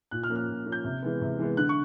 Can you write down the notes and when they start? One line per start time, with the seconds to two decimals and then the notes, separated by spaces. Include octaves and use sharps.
0.11 A#2 F#6
0.23 F6
0.30 F3 A#3 C#4
0.36 F6
0.48 A#2
0.66 F3 A#3 C#4
0.72 G6
0.84 C3
1.02 E3 G#3 B3
1.22 C3
1.39 E3 G#3 B3
1.57 D3 F#6
1.69 C#6